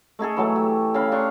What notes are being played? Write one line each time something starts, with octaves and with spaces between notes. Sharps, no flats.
A3 D#4 G#4 A4
E3 F#3 A3
G4
C#3 F5 B5
D4 A#5 C6 C#6